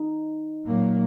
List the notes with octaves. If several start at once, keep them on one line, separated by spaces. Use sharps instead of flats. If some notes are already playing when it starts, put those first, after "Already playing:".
Already playing: D#4
A#2 F#3 A#3